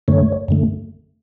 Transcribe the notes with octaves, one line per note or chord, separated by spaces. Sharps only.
F#2 D3 A3 C#5
F#2 D3 A3